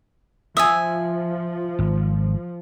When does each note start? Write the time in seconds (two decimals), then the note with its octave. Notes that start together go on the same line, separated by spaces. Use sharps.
0.57 F3 E5 G#5 D#6 E6
1.79 G#1